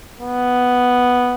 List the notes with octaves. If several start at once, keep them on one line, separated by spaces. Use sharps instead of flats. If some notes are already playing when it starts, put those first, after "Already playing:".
B3